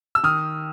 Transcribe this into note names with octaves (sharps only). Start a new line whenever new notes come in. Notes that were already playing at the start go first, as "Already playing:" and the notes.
E6
D#3 D#6 F6